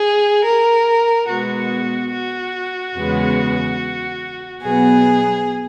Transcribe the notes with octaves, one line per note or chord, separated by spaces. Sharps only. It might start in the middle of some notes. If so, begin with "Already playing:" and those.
Already playing: G#4
A#4
B2 G#3 B3 F#4
F#4
E2 C#3 G#3 B3
B2 F#3 B3 G#4